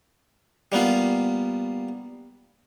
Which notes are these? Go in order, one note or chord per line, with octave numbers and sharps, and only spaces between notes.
G3 A#3 B3 F4